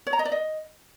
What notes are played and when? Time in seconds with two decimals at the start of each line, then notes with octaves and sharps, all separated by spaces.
0.07 C#5
0.13 A#5
0.19 D#5
0.25 D5
0.32 D#5